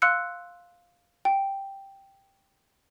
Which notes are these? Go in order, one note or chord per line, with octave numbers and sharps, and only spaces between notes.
F5 C6 E6 F#6 C#7
G5